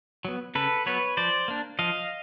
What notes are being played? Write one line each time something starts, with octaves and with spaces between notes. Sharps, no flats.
F#3 B3
C#3 A4 B4
F#3 B3 B4 C#5
F3 C5 D5
A#3 D4
F3 D#5 F5